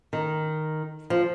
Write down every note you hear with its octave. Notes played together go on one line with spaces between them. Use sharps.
D#3
F3